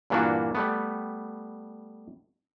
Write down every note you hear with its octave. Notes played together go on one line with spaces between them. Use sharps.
G2 A#2 E3 A#3 D4 F#4
G3 A3 B3